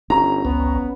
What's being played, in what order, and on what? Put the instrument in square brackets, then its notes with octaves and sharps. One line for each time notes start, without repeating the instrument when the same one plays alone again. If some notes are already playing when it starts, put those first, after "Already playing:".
[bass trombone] G1 [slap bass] C#4 [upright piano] A#5
[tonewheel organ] G1 C#2 [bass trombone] B3